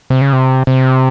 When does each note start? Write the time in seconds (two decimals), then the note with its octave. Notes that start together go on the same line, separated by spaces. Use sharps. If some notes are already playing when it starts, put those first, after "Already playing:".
0.10 C3
0.21 C#3
0.33 C3
0.67 C3